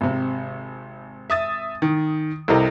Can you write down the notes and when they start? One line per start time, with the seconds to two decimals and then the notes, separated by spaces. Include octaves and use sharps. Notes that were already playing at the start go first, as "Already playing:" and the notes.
0.01 G#1 C3
1.30 E5 D#6 A6
1.82 D#3
2.48 C2 C3 A4 A#4 D#5